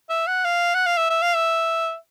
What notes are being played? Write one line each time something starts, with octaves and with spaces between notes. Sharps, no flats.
E5
F#5
F5
F#5
F5
E5
E5
F5
E5